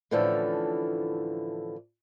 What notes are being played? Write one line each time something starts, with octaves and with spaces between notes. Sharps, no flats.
A2 D3 E3 F3 C#4 A4